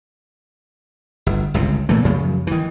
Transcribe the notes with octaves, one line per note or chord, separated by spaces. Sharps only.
G1
G1 C#2 C3
A#2 E3 A3
F#2 C#3 F3 F#3
D#3 E3